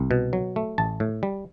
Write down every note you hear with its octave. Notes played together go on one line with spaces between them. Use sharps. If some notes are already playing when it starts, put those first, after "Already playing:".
Already playing: C2
B2
F#3
A3
A1 A5
A2
G3